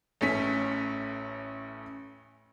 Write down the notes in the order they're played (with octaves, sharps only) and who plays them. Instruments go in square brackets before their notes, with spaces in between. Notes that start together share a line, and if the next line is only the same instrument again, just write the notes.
[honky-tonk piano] A1 A3 C#4 B6